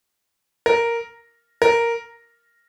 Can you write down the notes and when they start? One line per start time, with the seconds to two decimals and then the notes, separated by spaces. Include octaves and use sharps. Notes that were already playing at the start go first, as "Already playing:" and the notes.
0.66 A#4
1.62 A#4